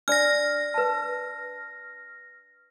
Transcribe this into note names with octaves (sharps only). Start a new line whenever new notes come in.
D4 D5 F6 A#6
B4 A5